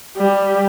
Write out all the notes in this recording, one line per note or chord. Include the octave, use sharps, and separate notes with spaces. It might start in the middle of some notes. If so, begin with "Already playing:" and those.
G3